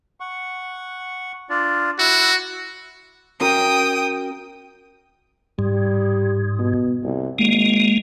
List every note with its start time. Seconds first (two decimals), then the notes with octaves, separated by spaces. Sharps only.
0.20 F#5 C#6
1.50 D4 F4 D5
1.99 E4 F#4 E6 F#6
3.41 C#4 F#4 A#4 G5 D#6
5.59 G#2 G3
6.59 B2
7.04 C2
7.39 G#1 G#3 A#3